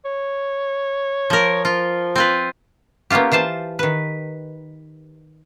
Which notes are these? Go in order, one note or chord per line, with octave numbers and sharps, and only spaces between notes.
C#5
F3 A#4
F3 F4
C4 F4 B4
A#3 B3 C#4 F4 G4
E3 F4 C5 A5
D#3 B4